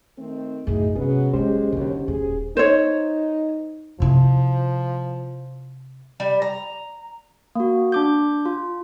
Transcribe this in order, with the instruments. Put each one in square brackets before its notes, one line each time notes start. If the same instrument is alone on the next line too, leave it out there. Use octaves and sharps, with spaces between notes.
[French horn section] D#3 A3 C4
[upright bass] F#2 A2 [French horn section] D#4 E4 G#4
[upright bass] G#2 C3 [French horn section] F#3 B3 B4 [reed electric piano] C#4 G#4
[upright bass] F#3 A#3 [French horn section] G#3 [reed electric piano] C#4 G4 C5
[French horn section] D#2 F#3 [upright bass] D3 E4
[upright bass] D#1 A1 [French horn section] G#4
[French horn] D#4 [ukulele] C5 C#5
[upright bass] C3 E4 [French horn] F3
[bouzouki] G3
A#5
[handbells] A#3 F#4
D4 D6 G6
F4